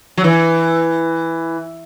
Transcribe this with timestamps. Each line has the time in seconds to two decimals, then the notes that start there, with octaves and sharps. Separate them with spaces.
0.17 F#3
0.24 E3